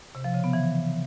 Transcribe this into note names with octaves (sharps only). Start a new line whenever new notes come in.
C3
F3
C#3
B3
E3